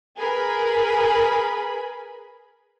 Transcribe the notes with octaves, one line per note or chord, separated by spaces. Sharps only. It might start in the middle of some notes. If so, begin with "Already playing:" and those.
G#4 A#4 B4 B5